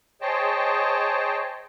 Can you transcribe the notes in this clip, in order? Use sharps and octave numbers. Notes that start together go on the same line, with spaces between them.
G#4 C5 C#5 D#5 G5 A5